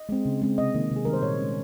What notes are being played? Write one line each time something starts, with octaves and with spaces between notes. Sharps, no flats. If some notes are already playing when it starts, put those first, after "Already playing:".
Already playing: D#5
G#3 C4
C#3
G#3 C4
C3 D#5
D#3 A#3
C3
G#4
D#3 G3 C4 A#4
C5
A#2 C#5
G#3 C#4